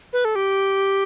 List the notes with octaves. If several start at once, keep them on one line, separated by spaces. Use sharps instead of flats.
B4
A4
G4